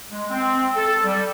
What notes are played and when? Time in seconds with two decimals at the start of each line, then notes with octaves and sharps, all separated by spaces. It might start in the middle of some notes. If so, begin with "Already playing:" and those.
0.11 G#3
0.30 C4
0.76 A4
1.04 G3